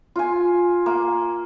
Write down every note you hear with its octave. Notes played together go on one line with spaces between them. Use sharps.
F4 G#5
A#3